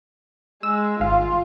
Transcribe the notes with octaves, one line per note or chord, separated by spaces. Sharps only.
G#3 E6
G#1 F4 F5